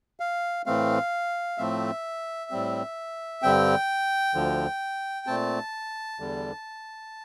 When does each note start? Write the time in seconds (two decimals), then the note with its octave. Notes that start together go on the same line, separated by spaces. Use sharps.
0.20 F5
0.66 A2 E3 A3 C4 F5
1.58 A2 F3 A3 C4 E5
2.51 A2 G3 C4
3.42 G2 D3 G3 C4 G5
4.35 D2 D3 F3
5.27 A#2 A3 C4 A5
6.20 E2 D3 G3